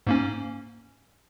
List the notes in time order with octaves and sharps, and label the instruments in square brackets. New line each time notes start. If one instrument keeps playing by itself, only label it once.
[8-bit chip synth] G#2 A#3 C#4